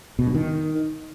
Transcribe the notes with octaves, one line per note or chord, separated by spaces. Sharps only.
B2
G2
D#3